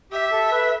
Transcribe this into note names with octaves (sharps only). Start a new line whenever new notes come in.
G4 E5
A4
B4